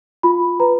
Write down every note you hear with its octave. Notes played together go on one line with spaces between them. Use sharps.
F4 B5
B4 A#5